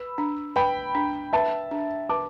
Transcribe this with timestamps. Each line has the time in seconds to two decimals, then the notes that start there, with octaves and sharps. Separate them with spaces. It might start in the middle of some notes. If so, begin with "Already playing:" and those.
Already playing: B4 B5 E6
0.18 D4
0.56 B4 G5 B5
0.95 D4
1.33 B4 E5 A5
1.71 D4
2.09 B4 A5 D6